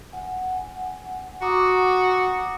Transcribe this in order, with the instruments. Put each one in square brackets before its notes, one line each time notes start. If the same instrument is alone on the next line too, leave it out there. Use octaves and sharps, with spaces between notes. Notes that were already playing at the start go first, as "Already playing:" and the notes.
[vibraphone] F#5 G#5
[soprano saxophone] F#4 [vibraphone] A#5 D6 D#6